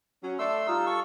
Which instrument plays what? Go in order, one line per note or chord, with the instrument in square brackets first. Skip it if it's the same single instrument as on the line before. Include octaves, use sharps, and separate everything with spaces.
[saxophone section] F#3 C#4
[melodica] A3 C6 E6 [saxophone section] A4 D5
[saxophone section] G3 D4 F4 [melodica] D#4 E6
[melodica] A4 C#6